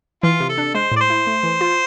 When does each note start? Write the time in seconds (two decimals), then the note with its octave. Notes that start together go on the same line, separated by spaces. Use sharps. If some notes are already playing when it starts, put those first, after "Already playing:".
0.23 E3 F4
0.40 C3
0.49 A4
0.58 D4
0.74 G#3 C5
0.92 A2 D5
1.01 C5
1.10 E4
1.27 A3
1.43 E3
1.61 F4